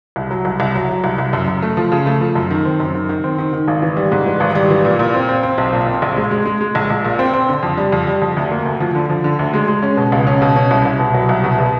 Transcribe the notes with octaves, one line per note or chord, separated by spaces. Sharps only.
C2
F#3
C2
C2
F#3
F#3
C2
C2
F#2
F#2
A3
F3
C#3
A3
F3
F#2
D#3
C4
F#2
D#3
D#3
C4
D#3
D#3
G#1
E3
G3
G#2
E3
G#1
G3
E3
A#2
A#2
C4
C4
C4
B1
A#2
C4
A#1
G#3
G#3
G#3
G#3
A#1
A#1
A#2
C4
C4
D3
F2
G3
F2
G3
F2
D2
A#3
D2
F3
D3
F3
D3
D2
G#3
G#3
C#4
B2
C#2
C#4
B2
C#4
C2
C2
B2
F#3
C2
B2
B2